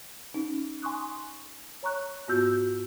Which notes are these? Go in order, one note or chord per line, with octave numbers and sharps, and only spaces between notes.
C#4 D#4
G#5 C6 C#6 D#6 F#6
C#5 A#5 C#6 F#6
G#2 B3 F4 F#4 E6 G6